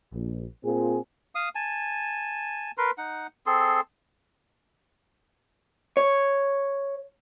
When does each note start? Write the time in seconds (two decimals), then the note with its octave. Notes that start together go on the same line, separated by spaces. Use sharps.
0.14 A#1
0.64 A#2 C4 F4 G#4
1.35 F5 D#6
1.55 G#5 A5
2.78 A#4 B4 C6
2.98 D#4 F#5
3.46 C4 G#4 A4 C6
5.97 C#5